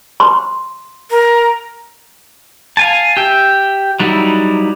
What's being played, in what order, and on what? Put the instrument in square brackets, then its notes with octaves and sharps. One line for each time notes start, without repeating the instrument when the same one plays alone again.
[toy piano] C6
[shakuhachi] A#4
[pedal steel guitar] F5 G#5 A5
G4 E5 G5
F#3 G3 D#4 E4